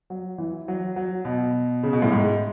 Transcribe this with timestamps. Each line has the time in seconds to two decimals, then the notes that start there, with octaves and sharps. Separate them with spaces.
0.10 F#3
0.38 E3
0.68 F#3
0.96 F#3
1.25 B2
1.83 C#3
1.93 B2
2.02 A2
2.12 G#2